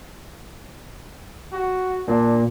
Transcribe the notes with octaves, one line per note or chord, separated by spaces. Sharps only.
F#4
A#2 D4